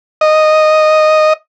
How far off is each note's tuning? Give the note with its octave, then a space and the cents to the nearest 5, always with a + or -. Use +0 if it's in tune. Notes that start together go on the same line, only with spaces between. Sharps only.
D#5 -5